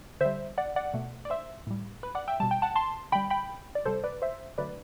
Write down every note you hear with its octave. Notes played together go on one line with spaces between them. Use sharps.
D3 G3 C5 E5
D5 F#5
D5 F#5
B2 A3
D5
C5 E5
A2 G3
B4
D5 F#5
E5 G5
B2 G3 A5
G5
F#5 A5
A5 C6
D3 G3 G5 B5
G5 B5
D5
C3 G3 A4 C5
B4 D5
C5 E5
D3 F#3 A3 B4 D5